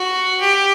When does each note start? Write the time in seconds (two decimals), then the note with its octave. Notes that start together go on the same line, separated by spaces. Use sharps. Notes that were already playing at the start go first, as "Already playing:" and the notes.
Already playing: F#4
0.40 G4